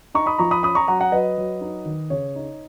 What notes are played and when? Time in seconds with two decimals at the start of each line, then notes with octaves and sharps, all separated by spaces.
0.14 D#4 A#5 C#6
0.26 B5 D#6
0.39 F3 A#5 C#6
0.51 B5 D#6
0.63 C#4 B5 D#6
0.75 A#5 C#6
0.88 F#3 F#5 A#5
1.00 F#5 A#5
1.12 F#3 B4 D#5
1.38 F#3
1.61 D#4
1.85 D#3
2.10 C#3 C#5
2.36 D#4